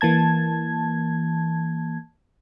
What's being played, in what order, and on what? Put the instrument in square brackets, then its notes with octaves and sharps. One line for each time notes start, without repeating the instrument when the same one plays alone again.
[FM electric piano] E3 A#3 A5 G#6